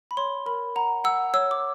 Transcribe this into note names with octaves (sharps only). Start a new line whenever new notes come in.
B5
C#5 C6
A#4 B5
F#5 A#5
F#5 E6
C#5 E6
D6